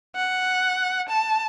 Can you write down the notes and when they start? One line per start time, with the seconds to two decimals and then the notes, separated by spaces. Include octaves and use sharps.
0.16 F#5
1.09 A5